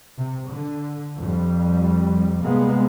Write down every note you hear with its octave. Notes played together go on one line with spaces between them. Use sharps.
C3
D3
F2 G3
C3 G3 G#3 A#3 B3